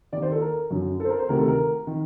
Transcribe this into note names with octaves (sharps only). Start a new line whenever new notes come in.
D#2 D#3 D5
C5
A4
A#4
F#2 D3
A4
C5
A#4
C5
D2 C3 D#3 A#4
A4
A#4
D#3